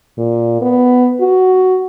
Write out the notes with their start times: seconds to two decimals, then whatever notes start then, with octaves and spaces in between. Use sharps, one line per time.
0.18 A#2
0.61 B3
1.21 F#4